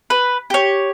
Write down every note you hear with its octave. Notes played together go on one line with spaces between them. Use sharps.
B4
G4 C#5